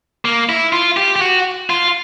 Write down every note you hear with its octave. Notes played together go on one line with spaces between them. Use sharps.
A#3
E4
F4
G4
G4
F#4
F4